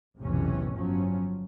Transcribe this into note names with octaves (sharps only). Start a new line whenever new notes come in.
B1 F2 A2 C3 E3 C#4
G1 F3 F#3 C#4